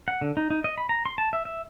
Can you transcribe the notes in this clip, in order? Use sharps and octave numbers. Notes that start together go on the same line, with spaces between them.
F#5
D3
D#4
D#4
D#5
B5
A#5
C6
A5
E5
E5